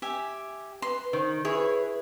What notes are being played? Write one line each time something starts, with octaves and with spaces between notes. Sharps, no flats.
G4 E5 G#5
B4 C6
D#3 C5
E4 G#4 B4 C#5